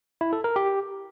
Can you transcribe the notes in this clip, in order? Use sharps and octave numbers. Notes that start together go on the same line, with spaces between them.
E4
A4
A#4
G4